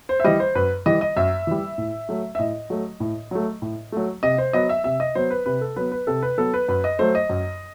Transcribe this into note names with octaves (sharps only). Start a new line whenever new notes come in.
C5
E5
E3 G3 D#5
C5
F#2 B4
E3 G3 D#5
D#5
F#2 E5
E3 G3
A2
F#3 A3
E5
A2 D#5
F#3 A3
A2
F#3 A3
A2
F#3 A3
C3 D#5
C5
F#3 B3 D#5
E5
C3 E5
D#5
F#3 B3 C5
B4
C3 B4
A4
F#3 B3 B4
B4
C3 A4
B4
F#3 B3 A4
B4
F#2 B4
D#5
F#3 A3 C5
D#5
F#2